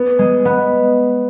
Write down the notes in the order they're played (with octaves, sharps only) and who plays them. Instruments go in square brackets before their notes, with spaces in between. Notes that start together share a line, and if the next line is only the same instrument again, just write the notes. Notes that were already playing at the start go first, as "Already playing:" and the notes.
Already playing: [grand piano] B3
[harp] G#3
B3